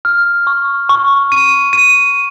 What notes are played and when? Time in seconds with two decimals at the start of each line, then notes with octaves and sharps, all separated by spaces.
0.05 F6
0.47 C#6
0.89 C#6
1.32 D#7
1.73 D#7